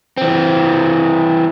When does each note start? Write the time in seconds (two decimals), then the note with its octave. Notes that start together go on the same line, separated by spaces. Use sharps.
0.17 E3 C4